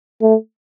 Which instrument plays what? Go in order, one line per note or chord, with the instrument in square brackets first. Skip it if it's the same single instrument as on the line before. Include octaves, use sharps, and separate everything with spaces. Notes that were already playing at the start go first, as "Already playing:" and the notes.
[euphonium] A3